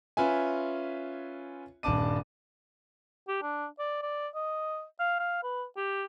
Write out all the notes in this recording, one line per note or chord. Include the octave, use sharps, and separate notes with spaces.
C#4 F4 B4 E5 G#5
D#1 G2 D4 A5 D6 D#7
G4
D4
D5
D5
D#5
F5
F5
B4
G4